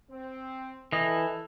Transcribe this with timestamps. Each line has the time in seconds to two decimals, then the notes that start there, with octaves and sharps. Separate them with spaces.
0.10 C4
0.92 E3 A4 D#5